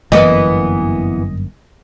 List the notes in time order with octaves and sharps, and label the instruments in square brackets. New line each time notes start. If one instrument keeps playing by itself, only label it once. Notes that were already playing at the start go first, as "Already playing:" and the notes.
[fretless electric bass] G1 F#2 A#3 [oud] E3 B3 B4 [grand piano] D#5